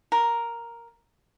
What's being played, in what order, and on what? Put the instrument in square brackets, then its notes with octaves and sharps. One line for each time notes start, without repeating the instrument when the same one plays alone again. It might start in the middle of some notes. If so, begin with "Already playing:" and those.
[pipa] A#4